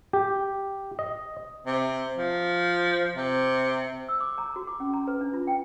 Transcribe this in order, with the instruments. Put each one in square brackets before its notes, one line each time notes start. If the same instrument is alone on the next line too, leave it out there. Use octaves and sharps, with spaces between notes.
[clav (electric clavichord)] G4
D#5
[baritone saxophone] C3
F3
C3
[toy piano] E6
D6
A#5
F#4
D6
C#4
A#5
B4
D4
F4
G5